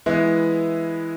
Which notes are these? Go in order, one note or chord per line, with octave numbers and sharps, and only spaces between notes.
E3 G#3 B3 E4